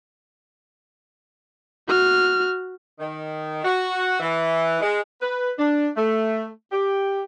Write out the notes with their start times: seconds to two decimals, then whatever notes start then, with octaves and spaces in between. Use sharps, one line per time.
1.88 F#4 F6
2.99 D#3
3.64 F#4
4.20 E3
4.81 G#3
5.22 B4
5.58 D4
5.96 A3
6.72 G4